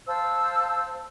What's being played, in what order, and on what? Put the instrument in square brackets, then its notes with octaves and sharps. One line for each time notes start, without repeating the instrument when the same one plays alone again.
[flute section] C5 F5 A5 E6